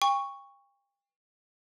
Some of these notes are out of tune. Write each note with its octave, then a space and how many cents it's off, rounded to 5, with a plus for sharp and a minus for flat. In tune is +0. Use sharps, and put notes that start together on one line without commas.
G5 +40 C#6 +0